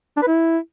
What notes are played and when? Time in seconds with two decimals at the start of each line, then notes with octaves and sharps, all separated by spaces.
0.17 D4
0.22 B4
0.28 E4